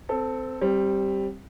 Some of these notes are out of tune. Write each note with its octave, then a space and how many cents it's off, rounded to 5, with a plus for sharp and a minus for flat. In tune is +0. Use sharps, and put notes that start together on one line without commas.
C4 -15 A4 +5
G3 +0 C4 +20